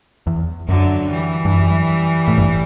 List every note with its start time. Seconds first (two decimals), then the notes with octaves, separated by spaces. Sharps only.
0.27 E2
0.68 F#2 D3 F#3
1.11 E3 G3
1.45 G2
1.53 F#2
2.28 A2
2.38 G1 G2